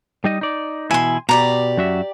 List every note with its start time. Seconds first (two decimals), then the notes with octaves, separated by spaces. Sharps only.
0.24 G3 D#4 D#5
0.41 D#4 D5
0.91 B2 E3 E4 G#5 C6
1.29 B2 G4 D5 A#5
1.77 F#2 F#4 E5